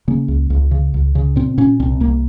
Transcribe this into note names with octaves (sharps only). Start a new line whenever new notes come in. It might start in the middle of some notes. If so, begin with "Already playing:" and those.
C#3 A#3
C#2
C#2
C#3
C#2
C#3
A#2 C4
A#2 C#4
C2 C4
C2 A#3